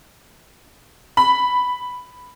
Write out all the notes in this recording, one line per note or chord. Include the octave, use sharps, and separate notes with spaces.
B5